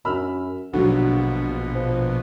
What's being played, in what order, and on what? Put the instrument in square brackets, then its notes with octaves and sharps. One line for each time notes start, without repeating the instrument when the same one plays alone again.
[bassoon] F#2 [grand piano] B5 E6 F6
[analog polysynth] A#1 B2 [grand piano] D3 F#3 [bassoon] F#4
[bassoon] F3